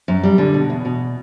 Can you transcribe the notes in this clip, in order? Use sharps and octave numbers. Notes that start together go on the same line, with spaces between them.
F#2
G3
D3
B2
E2
B2